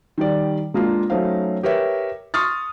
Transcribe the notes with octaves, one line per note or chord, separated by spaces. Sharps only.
D#3 G3 D5
G#3 A#3 D4 F4
F#3 A3 C#4 D#4 C5 F5
G4 A#4 B4 C#5 E5
C6 C#6 D#6 F6 A6